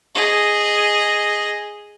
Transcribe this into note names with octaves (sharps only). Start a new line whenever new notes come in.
G#4 D#5